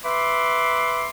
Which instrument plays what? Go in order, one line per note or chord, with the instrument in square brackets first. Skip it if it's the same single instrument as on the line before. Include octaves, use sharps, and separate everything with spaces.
[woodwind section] B4 E5 B5 C6 D6